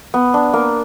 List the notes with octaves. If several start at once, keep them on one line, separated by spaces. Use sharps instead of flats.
B3
D4
A#3